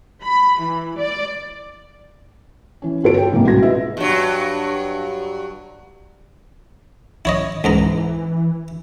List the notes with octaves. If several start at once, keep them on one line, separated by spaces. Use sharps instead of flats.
B5
E3
D5
E3 C#4
G1 F4 F#4 A4 C#5 D7
G5
G#2 C3 E3 G3 G#3 A#3
C#2 B2 F#4 G#6 A#6
F4 G#4 B4 D#5 E5
G2 F#3
E4 C#5 D#5
C#2 G#2 E3 A#5